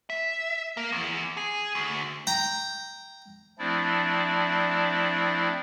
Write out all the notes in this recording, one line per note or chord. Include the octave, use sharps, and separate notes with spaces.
E5
A#3
E2
G#4
D2
G5 A#5
F3 A3 C4 D4 E4 D5